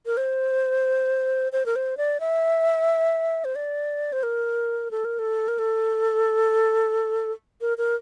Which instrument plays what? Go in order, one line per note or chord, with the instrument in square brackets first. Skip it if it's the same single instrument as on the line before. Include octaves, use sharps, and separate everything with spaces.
[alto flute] A#4
C5
C5
A#4
C5
D5
E5
C5
D5
C5
A#4
A4
A#4
A4
A#4
A4
A#4
A#4